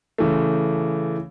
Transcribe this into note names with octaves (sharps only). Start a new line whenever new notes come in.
C#3 E3 A3